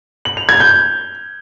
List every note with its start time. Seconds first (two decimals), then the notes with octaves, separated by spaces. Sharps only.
0.25 F#7
0.37 F7
0.49 G#6
0.60 G6